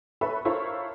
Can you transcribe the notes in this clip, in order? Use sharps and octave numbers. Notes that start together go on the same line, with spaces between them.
A4 B4 C#5 E5 B5
E4 A4 A#4 C5 C#5 F5